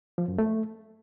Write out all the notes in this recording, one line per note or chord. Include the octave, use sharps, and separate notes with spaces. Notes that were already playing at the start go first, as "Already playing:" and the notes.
F3
F#2
A3